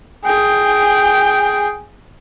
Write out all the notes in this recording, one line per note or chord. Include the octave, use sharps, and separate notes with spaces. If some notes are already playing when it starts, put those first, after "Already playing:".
G#4 G5